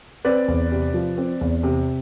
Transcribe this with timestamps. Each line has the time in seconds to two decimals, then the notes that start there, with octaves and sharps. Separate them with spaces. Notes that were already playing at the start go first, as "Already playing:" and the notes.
0.25 C4 B4 D5
0.48 E2
0.71 C3
0.94 F3
1.18 C4
1.41 E2
1.63 C3